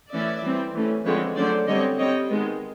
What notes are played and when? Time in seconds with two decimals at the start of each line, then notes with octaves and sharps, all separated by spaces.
0.12 E3 A3 C#4 D5 E5
0.43 E3 G3 C4
0.75 E3 A3 C#4
1.05 D3 F3 G#3 C4 B4 C#5
1.36 D3 F#3 A3 C#4 C5 D5
1.68 D3 G3 C4 C#5 D#5
1.99 G3 C4 C#5 D#5
2.29 D#3 G#3 B3